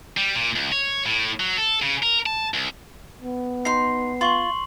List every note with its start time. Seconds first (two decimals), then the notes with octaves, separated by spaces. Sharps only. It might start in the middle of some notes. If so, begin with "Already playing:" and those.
0.17 G3
0.35 A#2
0.56 C#2
0.72 C#5
1.06 A2
1.40 F#3
1.57 A4
1.82 C#3
2.03 A#4
2.26 A5
2.54 C2
3.22 B3
3.65 D#4 C6 C7
4.21 F4 C6 C#6 F#7